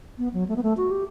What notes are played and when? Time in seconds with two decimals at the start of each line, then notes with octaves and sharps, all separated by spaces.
0.18 B3
0.34 F#3
0.49 A3
0.56 B3
0.63 A3
0.77 F#4
0.91 G4